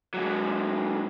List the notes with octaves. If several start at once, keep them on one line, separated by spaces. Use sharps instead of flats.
G#2 F#3